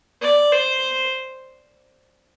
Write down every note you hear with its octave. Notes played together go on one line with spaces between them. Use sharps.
D5
C5